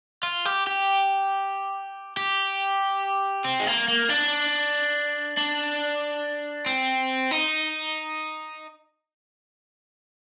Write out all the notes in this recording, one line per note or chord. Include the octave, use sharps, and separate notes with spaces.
F4
G4
G4
G4
C4
G#3
A#3
A#3
D4
D4
C4
D#4